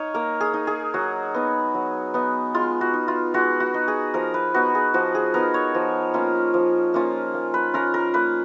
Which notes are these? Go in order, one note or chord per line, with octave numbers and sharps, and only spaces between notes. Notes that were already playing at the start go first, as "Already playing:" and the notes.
Already playing: D#4 C#5 D#5 F5
A#3 A#4
G#4
D#4
G#4
F#3 F#4
B3 D#4
F#3
B3 D#4
G#3 F4
F#4
D#4
F4
G#3 F#4
F#4
D#4
G#4
F3 A#4
B4
B3 D#4 F#4
G#4
F3 F#4
G#4
B3 D#4 A#4
C#5
F3
A#3 C#4 F4
F3
A#3 C#4 F4
A#3
B4
C#4 F4 A#4
A#4
A#3 B4